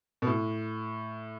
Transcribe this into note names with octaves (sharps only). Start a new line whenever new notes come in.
B2
A2